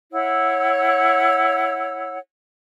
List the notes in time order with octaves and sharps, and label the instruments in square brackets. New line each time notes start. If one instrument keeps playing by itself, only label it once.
[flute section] E4 C#5 F#5 E6